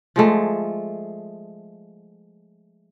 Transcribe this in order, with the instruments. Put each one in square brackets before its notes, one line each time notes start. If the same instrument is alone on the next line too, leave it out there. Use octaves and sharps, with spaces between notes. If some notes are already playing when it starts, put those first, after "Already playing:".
[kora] F3 G#3 A3